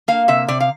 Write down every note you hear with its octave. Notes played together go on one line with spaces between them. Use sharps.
A#3 F5
C3 E5
C3 D5
F5